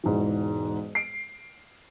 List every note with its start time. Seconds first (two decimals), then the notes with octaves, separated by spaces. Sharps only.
0.04 E1 G#2 E3
0.95 C7 D7